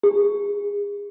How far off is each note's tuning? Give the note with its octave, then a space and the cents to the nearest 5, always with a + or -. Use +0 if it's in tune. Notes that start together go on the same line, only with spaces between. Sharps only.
G#4 -30